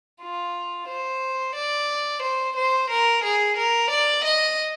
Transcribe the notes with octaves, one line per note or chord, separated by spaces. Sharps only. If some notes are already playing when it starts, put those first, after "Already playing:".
F4
C5
D5
C5
C5
A#4
G#4
A#4
D5
D#5